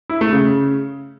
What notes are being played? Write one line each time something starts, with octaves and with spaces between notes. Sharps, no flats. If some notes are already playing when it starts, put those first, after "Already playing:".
E4
A3
C#3